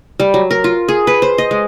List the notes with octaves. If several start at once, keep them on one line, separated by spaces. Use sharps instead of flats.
G3
F#3
A#4
F4
G#4
B4
C5
D#5
G#3